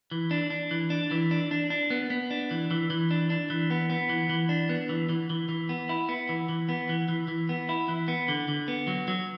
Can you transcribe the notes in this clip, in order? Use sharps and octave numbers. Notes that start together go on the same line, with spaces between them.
E3
D4
D4
E3
D4
E3
D4
D4
D4
B3
B3
D4
E3
E3
E3
D4
D4
E3
B3
B3
E3
E3
D4
B3
E3
E3
E3
E3
B3
E4
B3
E3
E3
B3
E3
E3
E3
B3
E4
E3
B3
D3
D3
B3
F#3
F#3